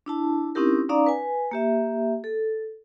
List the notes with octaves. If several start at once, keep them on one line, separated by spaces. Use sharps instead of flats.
D4 E4 A5
C4 C#4 D#4 E4 G4 A#4
C#4 D#4 D5 F5 A#5 D6
B4 G#5
A#3 G4 E5
A4